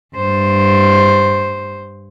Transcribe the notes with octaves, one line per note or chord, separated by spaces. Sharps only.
G2 C5